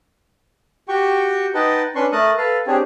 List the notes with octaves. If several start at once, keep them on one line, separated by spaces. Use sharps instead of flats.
F#4 G4 G5 C#6
D#4 B4 D#5 F#5 G5 A5
C#4 D4 B4 C6 C#6
A3 A#4 A5 D#6 F#6
A4 B4 F5
C4 D4 G4 G#4 C#5